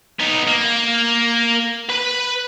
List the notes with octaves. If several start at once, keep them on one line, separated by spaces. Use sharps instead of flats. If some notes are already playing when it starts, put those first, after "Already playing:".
B3 D#4
A#3
B4 B5